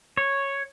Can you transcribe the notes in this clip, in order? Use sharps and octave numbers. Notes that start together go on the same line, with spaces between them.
C#5